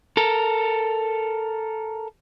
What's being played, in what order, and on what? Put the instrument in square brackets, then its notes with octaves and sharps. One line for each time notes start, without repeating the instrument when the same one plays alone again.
[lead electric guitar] A4 A#4